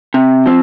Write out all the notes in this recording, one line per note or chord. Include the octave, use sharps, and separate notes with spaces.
C3
F3 C4